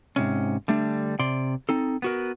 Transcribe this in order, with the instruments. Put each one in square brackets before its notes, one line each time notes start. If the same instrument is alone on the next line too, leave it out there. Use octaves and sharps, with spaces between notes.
[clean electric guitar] G#2 C3 C#4
D3 G3 A3 D4
C3 D5 C6
C4 D#4 A4
B3 F#4 A#4